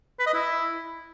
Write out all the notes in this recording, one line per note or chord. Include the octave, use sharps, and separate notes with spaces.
B4
D#5
E4